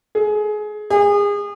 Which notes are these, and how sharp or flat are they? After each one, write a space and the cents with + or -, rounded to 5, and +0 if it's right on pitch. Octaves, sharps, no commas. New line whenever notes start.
G#4 +25
G#4 -30